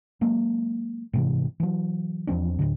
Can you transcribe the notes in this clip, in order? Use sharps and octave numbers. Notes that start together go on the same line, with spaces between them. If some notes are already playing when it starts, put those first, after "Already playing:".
F#3 G#3 A#3
G#2 C3 E3
E3 F#3
E2 F3 C4 D4
D1 A#1 A2 D3